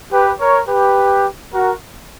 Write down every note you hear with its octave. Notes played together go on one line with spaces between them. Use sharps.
G4 B4
A#4 C#5
G4 B4
F#4 A#4